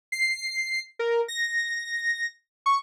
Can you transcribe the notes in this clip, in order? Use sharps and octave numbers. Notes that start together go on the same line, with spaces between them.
C7
A#4
A#6
C#6